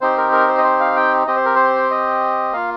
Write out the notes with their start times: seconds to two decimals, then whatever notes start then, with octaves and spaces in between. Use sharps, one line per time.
0.01 C4 D#4 G4 C5
0.17 A#4
0.32 A#4
0.48 C5
0.58 D#5
0.64 C5
0.80 F5
0.96 G5
1.27 C4 G4 D#5
1.36 C5
1.45 A#4
1.55 C5
1.91 D#5
2.53 A#3 F4 F5